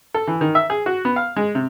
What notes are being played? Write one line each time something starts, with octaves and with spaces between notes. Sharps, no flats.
A4
E3
D#3
E5
G#4
F#4
B3
F5
G#3
C3